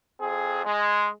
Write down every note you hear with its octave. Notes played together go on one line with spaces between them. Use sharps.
F2 C4 G#4
G#3